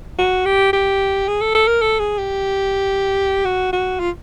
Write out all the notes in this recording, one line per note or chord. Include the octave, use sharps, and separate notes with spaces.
F#4
G4
G4
G#4
A4
A4
A#4
A4
G#4
G4
F#4
F#4
F4